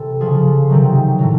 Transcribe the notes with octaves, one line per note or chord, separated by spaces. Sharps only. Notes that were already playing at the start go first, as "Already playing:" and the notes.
Already playing: C3 E3 A4
C#3 F3 G#4
C3 D#3 F#3
A2 F#3